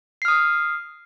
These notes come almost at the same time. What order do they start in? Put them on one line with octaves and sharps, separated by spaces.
C7 F6 D#6